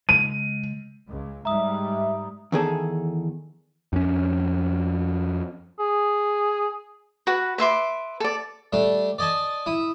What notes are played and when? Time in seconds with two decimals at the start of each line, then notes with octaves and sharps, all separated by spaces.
0.09 C#3 G#3 D#7
1.08 C#2 G#3
1.45 G#2 G3 G#3 E5 A#5 D#6
2.52 E2 D#3 G#4 A4
3.93 F2 C#4
5.80 G#4
7.27 F#4 B4
7.58 B4 E5 C6 D6
8.20 A4 D5
8.73 G3 A3 D4
9.18 D5 D#5 G#5 A5
9.66 E4 D#6